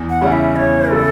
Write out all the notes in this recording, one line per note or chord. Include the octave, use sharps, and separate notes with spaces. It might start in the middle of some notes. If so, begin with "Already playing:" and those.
Already playing: E2
F#5
C#3 G3 C#4 E4
E5
E2 C#5
C#3 G3 C#4 E4 A4